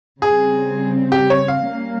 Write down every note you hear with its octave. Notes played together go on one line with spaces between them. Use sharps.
C#3 G3 C4 G#4
G4
C#5
F5
G3 A#3 C#4